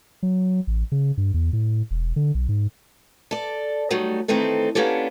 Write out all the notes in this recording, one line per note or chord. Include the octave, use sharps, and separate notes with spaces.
F#3
A1
C#3
G2
E2
A2
E1
D3
B1
G#2
A4 D5
F#3 G3 A3 D#4
D#3 E3 A3 C4 D#4 A4
A#3 B3 C#4 D4 G4 A4